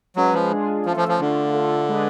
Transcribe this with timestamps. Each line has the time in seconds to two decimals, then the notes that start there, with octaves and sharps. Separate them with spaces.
0.16 F#3 G#3 C#4 G#4 B4
0.34 F3
0.50 G#3 D4 F4 G#4
0.86 F3 A3 C#4 F4 A4
0.97 F3
1.08 F3
1.19 D3 A3 D4 F4
1.54 A3 F4 A4
1.89 G#3 D4 G#4 B4